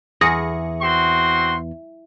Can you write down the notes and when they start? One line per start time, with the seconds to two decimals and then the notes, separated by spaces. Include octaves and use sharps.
0.21 E2 G#4 A#6 C#7
0.82 C4 F#4 C6